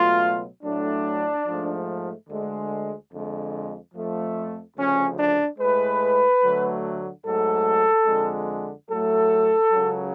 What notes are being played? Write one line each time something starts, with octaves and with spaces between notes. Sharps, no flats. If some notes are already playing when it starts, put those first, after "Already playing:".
Already playing: C#2 B2 F#3 A3 F4
A2 F#3 A3 D4
G#2 F3 A3
D2 D3 G#3
F2 D3 G#3
F2 F3 A3
D2 C#3 F3 C#4
D4
A2 G#3 B4
D2 D3 F#3 A3
G#2 F#3 A3 A4
F2 D3 G#3
A2 F#3 A3 A4
C#2 C#3 F#3